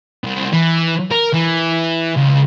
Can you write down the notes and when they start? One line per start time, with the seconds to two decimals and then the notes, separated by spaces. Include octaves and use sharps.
0.24 C2
0.53 E3
1.12 A#4
1.34 E3
2.17 C#2